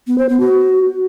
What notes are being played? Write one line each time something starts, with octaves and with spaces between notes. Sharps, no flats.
B3
C5
B3
F#4